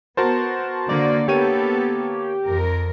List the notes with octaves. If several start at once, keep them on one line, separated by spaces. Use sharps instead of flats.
B3 F#4 A#4 C5 A5
D3 A#3 D5
A#3 B3 G4 A4 C#5 D#7
F2 A#4